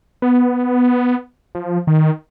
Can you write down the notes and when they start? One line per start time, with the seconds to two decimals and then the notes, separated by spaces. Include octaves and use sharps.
0.22 B3
1.55 F3
1.87 D#3